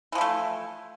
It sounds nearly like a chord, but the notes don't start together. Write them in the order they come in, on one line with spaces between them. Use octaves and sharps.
E3 F3 E4 A3